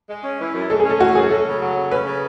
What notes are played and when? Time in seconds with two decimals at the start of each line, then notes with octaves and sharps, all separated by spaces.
0.09 G#3
0.24 C#4
0.39 E3
0.54 F#2
0.69 G#3 A4
0.80 G#4
0.85 C#4
0.90 A4
1.00 E3 F#4
1.15 F#2 G#4
1.30 C#4 A4
1.46 C#3
1.61 F#3
1.76 C#3
1.91 C#4 B4
2.06 C#3